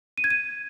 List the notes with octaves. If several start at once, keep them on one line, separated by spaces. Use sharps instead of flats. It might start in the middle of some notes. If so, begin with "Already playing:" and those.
D#7
G#6
D#7